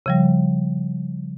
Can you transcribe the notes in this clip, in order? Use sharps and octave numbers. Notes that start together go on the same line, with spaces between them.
C#3 F3 G3